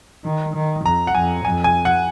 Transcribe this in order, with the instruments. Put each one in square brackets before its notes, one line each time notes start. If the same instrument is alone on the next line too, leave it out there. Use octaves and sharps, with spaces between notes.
[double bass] D#3
D#3
[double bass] F2 [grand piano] A#5
[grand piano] F#5
[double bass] F2 [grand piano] G#5
[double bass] F2 [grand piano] G#5
[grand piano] G#5
F#5